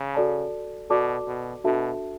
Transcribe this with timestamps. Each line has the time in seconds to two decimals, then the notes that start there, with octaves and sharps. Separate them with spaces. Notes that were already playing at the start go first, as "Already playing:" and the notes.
Already playing: C#3
0.15 F#4 A4 D5 A5
0.90 B2 F#4 A4 D5 A5 D6
1.27 B2
1.64 B2 D4 F#4 A4 E5 A5